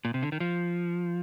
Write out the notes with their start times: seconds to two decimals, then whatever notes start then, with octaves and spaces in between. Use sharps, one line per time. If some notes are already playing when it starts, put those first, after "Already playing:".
0.05 A#2
0.14 C3
0.23 D3
0.32 D#3
0.40 F3